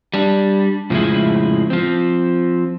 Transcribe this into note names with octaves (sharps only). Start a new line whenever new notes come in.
G3 D4
F2 A2 C#3 F3 G#3 E4
F3 C4